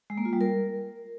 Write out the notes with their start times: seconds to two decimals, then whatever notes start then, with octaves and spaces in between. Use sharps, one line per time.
0.10 G#3
0.18 A#3
0.25 F4
0.33 G3
0.41 A#4